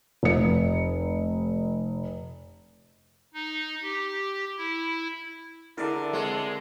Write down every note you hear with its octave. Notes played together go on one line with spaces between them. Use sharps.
F1 C#7
D#4
G4
E4
D3 E4 G#4 A#4 D5 E5
G#3 C4 A4